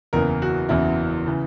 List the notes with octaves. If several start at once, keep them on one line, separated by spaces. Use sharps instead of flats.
F#1 E2 C#3 E3 A#4
F#4
F#1 E2 C#3 E3 E4
C#3 E3